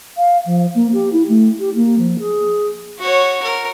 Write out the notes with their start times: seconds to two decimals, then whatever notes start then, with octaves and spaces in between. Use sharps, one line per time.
0.17 F5
0.46 F3
0.75 A#3
0.93 G4
1.13 E4
1.28 A3
1.59 G4
1.75 A#3
1.98 F3
2.19 G#4
2.99 F#4 C#5
3.43 A#4